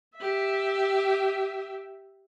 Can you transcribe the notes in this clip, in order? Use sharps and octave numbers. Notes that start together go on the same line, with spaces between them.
G4 E5